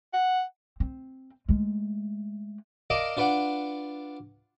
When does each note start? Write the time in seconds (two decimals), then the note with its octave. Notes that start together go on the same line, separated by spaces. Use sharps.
0.14 F#5
0.80 C4
1.48 G#3 A3
2.90 A#4 D5 D#5 F5 A5
3.17 D4 F4 B4 D5 F#5